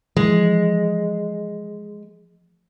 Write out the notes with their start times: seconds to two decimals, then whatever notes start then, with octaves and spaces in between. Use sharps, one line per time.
0.16 E3 F3 G#3